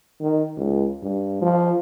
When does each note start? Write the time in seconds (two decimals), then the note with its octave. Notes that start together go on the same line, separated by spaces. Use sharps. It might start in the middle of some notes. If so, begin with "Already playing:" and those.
0.21 D#3
0.57 C#2
1.03 G2
1.42 F3